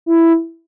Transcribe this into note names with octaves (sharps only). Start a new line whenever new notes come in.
E4